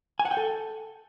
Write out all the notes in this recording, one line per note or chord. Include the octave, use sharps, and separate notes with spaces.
G#5
F#5
G5
A4